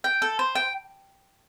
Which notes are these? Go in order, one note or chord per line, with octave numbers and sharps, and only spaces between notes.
G5
A4
C5
G5